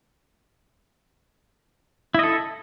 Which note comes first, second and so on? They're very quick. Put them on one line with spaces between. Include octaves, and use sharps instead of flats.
E4 D#5 A4